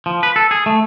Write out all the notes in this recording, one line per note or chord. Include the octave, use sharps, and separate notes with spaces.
F3
B4
A4
G#4
A3